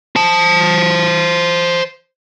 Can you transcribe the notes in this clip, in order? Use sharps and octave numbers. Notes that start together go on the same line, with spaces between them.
C5 A5